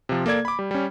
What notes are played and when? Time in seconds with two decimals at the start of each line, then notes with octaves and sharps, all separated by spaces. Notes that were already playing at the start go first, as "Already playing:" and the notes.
0.09 C3 F3
0.26 A#3 A4 D5 G#6
0.45 B5 D6
0.59 G3
0.71 G3 C#4